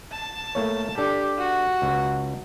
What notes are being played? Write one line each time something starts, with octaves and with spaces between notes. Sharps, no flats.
A5
A3 A#3 C#5
D4 G4 A4
F#4
C#2